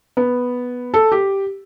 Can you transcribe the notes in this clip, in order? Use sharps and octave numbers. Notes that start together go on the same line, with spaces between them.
B3
A4
G4